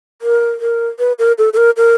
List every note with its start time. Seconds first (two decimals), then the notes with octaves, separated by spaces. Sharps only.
0.22 A#4
0.60 A#4
0.99 B4
1.19 A#4
1.38 A4
1.53 A4
1.57 A#4
1.77 A#4